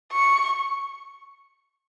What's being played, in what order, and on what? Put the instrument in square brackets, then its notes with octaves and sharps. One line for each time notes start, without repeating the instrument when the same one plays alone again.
[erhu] C#6